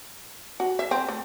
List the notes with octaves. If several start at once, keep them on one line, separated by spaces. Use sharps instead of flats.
F#4
E5
C4
A3